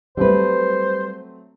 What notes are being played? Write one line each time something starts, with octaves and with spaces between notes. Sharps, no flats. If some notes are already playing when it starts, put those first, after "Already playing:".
F#3 G3 A3 C4 B4 C5